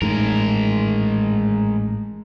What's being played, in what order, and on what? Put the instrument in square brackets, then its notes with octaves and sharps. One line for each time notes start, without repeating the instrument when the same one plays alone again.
[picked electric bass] A1 G#2 [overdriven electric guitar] G#3 A#4